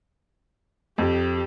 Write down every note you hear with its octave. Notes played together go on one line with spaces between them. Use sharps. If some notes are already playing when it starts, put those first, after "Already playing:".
F2 G4